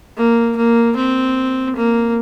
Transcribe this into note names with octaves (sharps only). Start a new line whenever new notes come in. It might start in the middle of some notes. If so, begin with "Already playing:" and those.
A#3
A#3
C4
A#3